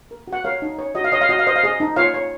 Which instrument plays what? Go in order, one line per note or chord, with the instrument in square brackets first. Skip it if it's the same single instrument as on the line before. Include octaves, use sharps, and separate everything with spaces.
[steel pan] A#4
F#4
F#5
A#4 C#5 F5
D#4
C#5
F#4 D#5
F5
C#5 D#5
F5
F#4 D#5
F5
C5 D#5
F5
G#4 D#5
D#4
F4 C#5 F5
C#5